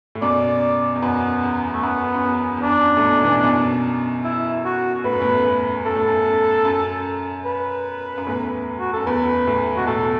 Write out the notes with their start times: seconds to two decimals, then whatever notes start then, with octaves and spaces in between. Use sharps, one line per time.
0.15 A2
0.22 F#2 B2 D5
0.95 E2
1.02 F#2 B3
1.43 E2
1.73 A3
1.83 F#2 B3
2.14 F#2
2.24 E2
2.57 E2
2.63 F#2 D4
2.83 F#2
2.97 A2
3.03 F#2 B2
3.23 B2 E3
3.44 F#2 B2
4.24 E4
4.65 F#4
5.04 A2 B4
5.13 F#2
5.21 E2 A2
5.45 F#2
5.85 F#2 A4
5.96 A2
6.08 F#2
6.65 F#2
7.45 B4
8.18 F#2
8.26 E2 A2
8.79 F#4
8.93 F#2 A4
9.06 E2 B4
9.47 E2 A2
9.77 B2 F#4
9.86 E2 A2 A4